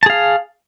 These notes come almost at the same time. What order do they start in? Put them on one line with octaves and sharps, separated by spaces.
A5 G#4 F5